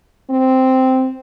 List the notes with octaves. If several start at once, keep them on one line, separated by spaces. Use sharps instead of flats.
C4